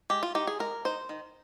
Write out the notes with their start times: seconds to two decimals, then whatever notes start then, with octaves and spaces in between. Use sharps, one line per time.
0.10 G#3 G4
0.23 F4
0.35 D#4 G4
0.47 G#4
0.59 G#3 A#4
0.85 D#4 C5
1.09 D#3